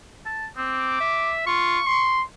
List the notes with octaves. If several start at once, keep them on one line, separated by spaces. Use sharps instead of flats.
A5
C4 D6
E5
F4 C#6
C6